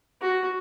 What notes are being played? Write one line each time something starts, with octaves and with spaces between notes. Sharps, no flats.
F#4